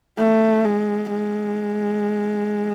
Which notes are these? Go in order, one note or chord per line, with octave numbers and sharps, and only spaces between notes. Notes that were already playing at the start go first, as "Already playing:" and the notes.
A3
G#3
G#3